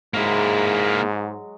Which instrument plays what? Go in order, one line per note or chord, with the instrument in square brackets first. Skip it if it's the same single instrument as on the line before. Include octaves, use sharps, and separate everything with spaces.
[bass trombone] G#2 [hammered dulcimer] F#3 G#3 F#4 [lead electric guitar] A#3 E4